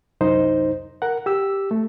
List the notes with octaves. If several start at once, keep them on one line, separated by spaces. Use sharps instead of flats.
C2 F#2 D#4 C5
A#4 F#5
G4 E6
A3